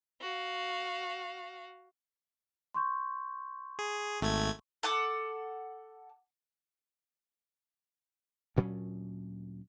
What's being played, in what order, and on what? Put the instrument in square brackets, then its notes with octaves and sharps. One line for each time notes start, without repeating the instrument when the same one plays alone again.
[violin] F#4 F5
[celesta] C6 C#6 G6
[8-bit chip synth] G#4
G#1 A3 G#6
[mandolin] A4 F#5 D6
[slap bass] D2 A#2 F#3 C#4